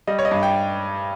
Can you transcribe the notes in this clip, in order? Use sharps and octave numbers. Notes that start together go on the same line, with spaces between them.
G3 D#5
C#5
D#5
G2
G5